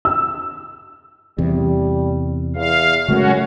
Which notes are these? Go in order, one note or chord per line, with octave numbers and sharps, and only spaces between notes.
E6
E2 C3 G3
E2 F5
F#2 C#3 G#3 A3 C#4 F#4